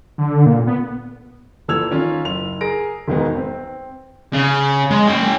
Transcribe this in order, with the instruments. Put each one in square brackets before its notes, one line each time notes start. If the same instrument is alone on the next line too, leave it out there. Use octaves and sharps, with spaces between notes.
[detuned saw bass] D3
A#2
B3
[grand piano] A#2 E3 A4 E6 G#6 F7
D#3 C#4 F4 F6
F#1 F7
G#4 A#4 A#6 D7
E1 G#2 D#3 G#3 B3
C4
[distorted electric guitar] C#3
G#3
C#4 G5